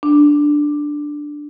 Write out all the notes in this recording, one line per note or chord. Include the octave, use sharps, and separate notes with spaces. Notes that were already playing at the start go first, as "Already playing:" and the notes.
D4